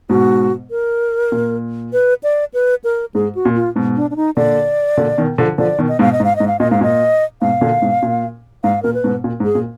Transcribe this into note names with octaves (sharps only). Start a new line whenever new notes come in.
G#2 B2 F#4
A#4
A#2
B4
D5
B4
A#4
G#2 G#4
F#4
A#2
F4
G#2 B2
D4
D4
D#4
A#2 D3 D5
A#2 D3
B2 D#3
D3 F3
D3 F3 D5
B2 D#3
D#5
G#2 B2 F5
D#5
G#2
F5
G#2 D#5
F5
A#2 D#5
G#2 F5
A#2 D#5
G#2 B2 F5
A#2 D3
G#2 B2
A#2
G#2 F5
A#2 A#4
B4
G#2 B2
A#2
G#2
G#4
A#2